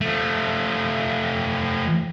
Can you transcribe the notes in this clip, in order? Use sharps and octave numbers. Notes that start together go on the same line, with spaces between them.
F3 A3